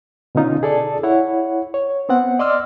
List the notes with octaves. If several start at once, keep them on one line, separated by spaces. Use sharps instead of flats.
B2 D3 C#4 D#4 F4
G#4 A4 D5 A5
E4 C#5 F#5
C#5
B3 C4 F#5
D5 D#5 C6 D6 E6 F6